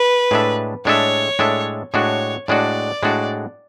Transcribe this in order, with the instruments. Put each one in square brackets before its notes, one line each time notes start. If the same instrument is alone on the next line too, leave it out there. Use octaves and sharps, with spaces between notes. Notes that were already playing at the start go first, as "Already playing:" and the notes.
Already playing: [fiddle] B4
[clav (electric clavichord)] A2 G#3 D4 A4 E5
[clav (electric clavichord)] A2 G#3 D4 A4 E5 [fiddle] C#5
[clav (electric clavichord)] A2 G#3 D4 A4 E5
[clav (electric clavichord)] A2 G#3 D4 F#4 [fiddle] C#5
[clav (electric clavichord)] A2 G#3 D4 F#4 [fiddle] D5
[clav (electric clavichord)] A2 G#3 D4 F#4